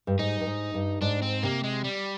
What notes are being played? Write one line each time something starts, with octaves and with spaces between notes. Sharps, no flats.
G2
G#2 D#4
G2
G#2
G2
G#2 D4
C4
C3 A#3
G#3
G3